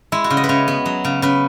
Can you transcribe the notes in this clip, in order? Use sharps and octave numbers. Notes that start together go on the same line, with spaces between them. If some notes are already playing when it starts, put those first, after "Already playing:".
G#3 E4
F#4
C#3
D#5
B4
C#3 C#5
B3
F#3
C#3
C#3 B4